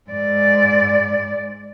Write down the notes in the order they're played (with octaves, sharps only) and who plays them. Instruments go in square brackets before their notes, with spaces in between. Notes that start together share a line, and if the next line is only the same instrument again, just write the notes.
[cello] G#2 D5